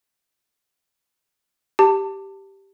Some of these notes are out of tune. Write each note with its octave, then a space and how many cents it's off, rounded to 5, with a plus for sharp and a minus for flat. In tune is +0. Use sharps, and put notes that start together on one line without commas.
G4 -5 A5 +25